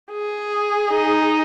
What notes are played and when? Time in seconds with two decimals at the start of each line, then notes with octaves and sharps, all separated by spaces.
0.12 G#4
0.90 D#4